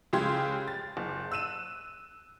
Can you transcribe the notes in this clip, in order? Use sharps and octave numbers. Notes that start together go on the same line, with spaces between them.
C#2 C#3 G4 C6 G#6
A6
F#1
E6 F#6 D#7 E7